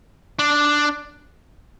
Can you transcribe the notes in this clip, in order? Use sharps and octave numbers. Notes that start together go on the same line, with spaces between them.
D4